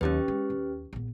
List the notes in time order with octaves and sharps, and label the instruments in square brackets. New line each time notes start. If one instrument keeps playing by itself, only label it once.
[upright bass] D#2 F#3 [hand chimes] C#4 G4 B4
[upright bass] G#3
D#2
A#1 B3